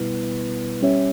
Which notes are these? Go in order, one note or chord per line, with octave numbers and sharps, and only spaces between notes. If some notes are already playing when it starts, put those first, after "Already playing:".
Already playing: B2 G3 B3 E4 B4
G3 C#4 G4 C#5 E5